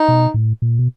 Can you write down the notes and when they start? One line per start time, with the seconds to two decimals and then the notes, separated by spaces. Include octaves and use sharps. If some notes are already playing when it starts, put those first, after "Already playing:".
Already playing: D#4
0.08 B2
0.34 A2
0.62 A#2
0.79 B2